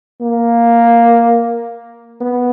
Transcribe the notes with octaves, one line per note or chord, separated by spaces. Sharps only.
A#3
B3